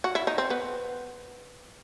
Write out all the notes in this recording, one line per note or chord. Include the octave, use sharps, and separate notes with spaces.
F#4
E4
D#4
C4
B3